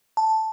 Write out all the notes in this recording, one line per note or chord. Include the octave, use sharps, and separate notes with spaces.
A5